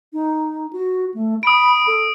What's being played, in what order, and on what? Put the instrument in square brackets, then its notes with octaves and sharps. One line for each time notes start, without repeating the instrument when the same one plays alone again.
[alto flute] D#4
F#4
A3
[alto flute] B5 [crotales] D#6 D7
[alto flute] A4